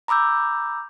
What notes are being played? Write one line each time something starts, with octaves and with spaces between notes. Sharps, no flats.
A#5 B5 D6 E6 G6